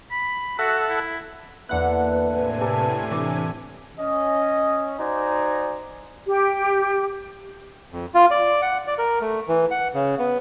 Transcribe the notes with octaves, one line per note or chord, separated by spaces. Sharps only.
B5
F#4 A4 E5 F#5
E4
E2 D3 A#3 E4 B4 F#5 F#6
A2 C3 G#5
G4 A4 A#4
E3 D4 D6
C#4 D#5
D#4 F#4 C5 D5 G#5 A#5
G4
F2
F4
D5
F#5
D5
A#4
A3
E3
F#5
C#3
B3